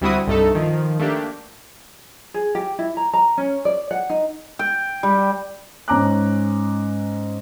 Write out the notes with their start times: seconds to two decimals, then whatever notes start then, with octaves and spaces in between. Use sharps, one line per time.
0.01 D2 G3 C4 E4 F#4 D#6
0.27 C2 G2 A3 D#4 A4
0.55 D#3 F3
1.00 A3 A#3 D4 G4
2.34 G#4
2.55 G4
2.79 E4
2.97 A#5
3.13 A#5
3.38 C#4
3.65 D5
3.91 F#5
4.10 D#4
4.59 G5
5.03 G3
5.88 G#2 C#4 A#5 D6 F#6